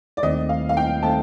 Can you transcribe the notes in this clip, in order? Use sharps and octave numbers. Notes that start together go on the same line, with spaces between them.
D5
D#2 D#3 A3 C4 D#5
F5
F5
G5
D#3 A3 C4 A5